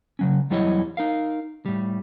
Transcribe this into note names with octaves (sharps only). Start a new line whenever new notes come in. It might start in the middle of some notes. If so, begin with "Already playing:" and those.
C#3 F#3 C#4
E2 F#3 G3 E4 C#5 D#5
D#4 A#4 F5
A2 G3